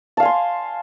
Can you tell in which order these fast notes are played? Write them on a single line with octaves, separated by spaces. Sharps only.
A5 F5 G#5 C6